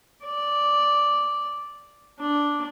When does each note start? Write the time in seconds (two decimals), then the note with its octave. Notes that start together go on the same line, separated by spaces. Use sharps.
0.24 D5
2.19 D4